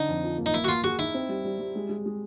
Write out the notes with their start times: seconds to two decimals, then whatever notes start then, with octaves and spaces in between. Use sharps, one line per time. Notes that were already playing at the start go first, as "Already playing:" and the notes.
Already playing: D3 D#4
0.08 F2
0.23 F3
0.38 A#3
0.46 D#4
0.54 A#3 E4
0.64 F#4
0.68 A#3 F4
0.84 F#4 G#4
0.99 D#4 E4
1.14 C4
1.29 G3
1.45 G3
1.59 G3
1.75 G#3
1.89 G#3
2.06 G#3